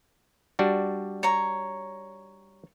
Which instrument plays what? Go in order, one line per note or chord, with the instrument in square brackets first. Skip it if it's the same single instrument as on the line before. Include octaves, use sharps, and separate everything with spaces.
[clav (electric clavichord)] G3 D4 F#4
[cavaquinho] C#5 A#5